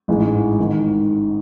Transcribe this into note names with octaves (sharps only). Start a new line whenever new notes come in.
A1 G#2 E3 G#3
G#1 G#2 D#3